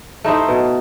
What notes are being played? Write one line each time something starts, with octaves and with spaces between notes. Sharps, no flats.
A3 D#4 E4 C5
B2